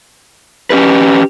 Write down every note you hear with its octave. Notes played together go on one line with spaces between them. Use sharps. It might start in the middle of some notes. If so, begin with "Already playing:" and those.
C#4 G4 B4